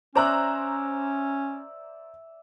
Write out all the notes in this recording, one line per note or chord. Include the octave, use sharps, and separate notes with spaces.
C#4 C5 D5 E5 A#5 F#6